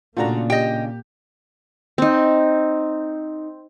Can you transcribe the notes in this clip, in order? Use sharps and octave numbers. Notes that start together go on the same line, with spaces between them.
A#2 C#3 A3 A#3 D4 F4 F#4 A#5
G4 D#5 G5
C4 D#4